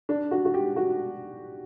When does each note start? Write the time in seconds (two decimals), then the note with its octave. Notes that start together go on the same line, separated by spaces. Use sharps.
0.09 D4
0.31 F#4
0.45 F#4
0.54 G4
0.76 F#4